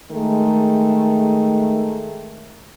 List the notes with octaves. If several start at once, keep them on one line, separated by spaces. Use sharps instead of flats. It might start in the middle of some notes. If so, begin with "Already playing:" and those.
D#3 G#3 A3